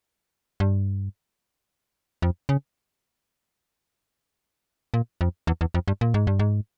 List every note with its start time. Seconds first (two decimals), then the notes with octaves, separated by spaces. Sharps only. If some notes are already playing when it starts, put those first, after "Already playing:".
0.60 G2
2.22 F2
2.49 C#3
4.94 A#2
5.21 F2
5.47 E2
5.61 E2
5.74 F2
5.88 G2
6.01 A#2
6.14 G#2
6.27 G2
6.39 G#2